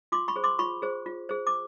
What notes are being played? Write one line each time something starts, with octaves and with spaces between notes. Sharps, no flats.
F4 C6 D6
B5 C#6
G#4 C5
C6 D6
F4 B5 C#6
G#4 C5
F4
G#4 C5
D6